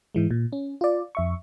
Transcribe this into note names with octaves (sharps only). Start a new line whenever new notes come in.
G#2 E3 G#3
A#2
C#4
F4 D5
F2 E5 C#6